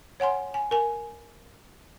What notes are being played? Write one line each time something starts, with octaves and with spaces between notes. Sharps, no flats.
C#5 F#5 G#5 C6
G#5
A#4 G#5